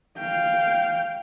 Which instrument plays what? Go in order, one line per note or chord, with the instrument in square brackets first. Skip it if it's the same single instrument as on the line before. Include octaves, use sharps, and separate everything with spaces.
[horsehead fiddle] F5 G5